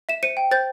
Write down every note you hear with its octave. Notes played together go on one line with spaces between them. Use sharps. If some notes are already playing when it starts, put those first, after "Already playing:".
E5 E7
C5 C#7 D#7
G5
C5 G6 A6